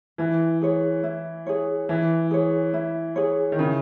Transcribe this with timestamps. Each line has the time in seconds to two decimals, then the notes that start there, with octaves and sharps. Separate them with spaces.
0.18 E3 E4
0.62 G#4 C#5
1.03 E4
1.47 G#4 C#5
1.89 E3 E4
2.31 G#4 C#5
2.74 E4
3.16 G#4 C#5
3.52 D#3
3.58 C#3 E4